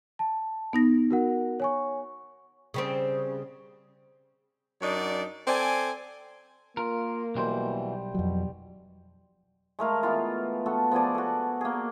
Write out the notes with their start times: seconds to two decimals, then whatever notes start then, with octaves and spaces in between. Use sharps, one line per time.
0.19 A5
0.73 B3 D#4 A#6
1.11 F#4 A#4 F#5
1.60 C#5 G#5 C#6
2.74 C#3 G3 C4
4.82 F#2 F#3 D4 D#4 D5
5.48 C4 A4 D5 G#5
6.77 A#3 F4 A#4
7.35 B1 B2 E3 G3 C5
8.14 F2 B2 F#3
9.79 G#3 A3 A#4 F5
10.03 E3 B3 F4
10.66 B3 F#4 A4
10.91 F3 B3 G#4 D5
11.15 F#4 A4
11.61 A#3 G#4